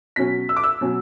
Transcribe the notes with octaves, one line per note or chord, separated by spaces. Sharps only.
B2 F#3 C#4 B6
E6
D6
E6
B2 F#3 C#4